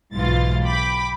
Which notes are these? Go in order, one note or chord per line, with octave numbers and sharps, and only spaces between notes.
B1 G#2 B2 E3 F4 A6
G5 B5 D6